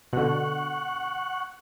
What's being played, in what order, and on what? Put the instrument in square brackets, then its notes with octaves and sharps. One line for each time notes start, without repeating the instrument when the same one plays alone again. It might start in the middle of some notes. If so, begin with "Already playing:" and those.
[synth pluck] B2 D3 [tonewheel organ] F#5 C#6 F#6